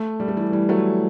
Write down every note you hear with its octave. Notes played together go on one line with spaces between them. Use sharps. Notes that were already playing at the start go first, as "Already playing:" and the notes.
Already playing: A3
G3
A3
E3 G3
E3 G3
F#3 A3